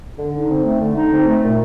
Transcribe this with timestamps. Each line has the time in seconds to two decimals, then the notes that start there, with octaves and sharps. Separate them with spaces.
0.17 D3
0.33 D#4
0.49 C4
0.64 A3
0.80 D3
0.96 D#4
1.11 C4
1.27 A3
1.43 A#2